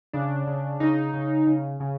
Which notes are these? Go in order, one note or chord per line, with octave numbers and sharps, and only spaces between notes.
C#3 D4
C#3
C#3 D#4
C#3
C#3
C#3